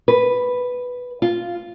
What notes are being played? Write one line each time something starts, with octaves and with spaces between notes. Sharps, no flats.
B4
F4